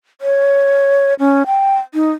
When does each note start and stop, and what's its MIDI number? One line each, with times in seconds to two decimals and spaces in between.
0.21 1.14 73
1.19 1.43 61
1.47 1.78 79
1.94 2.11 63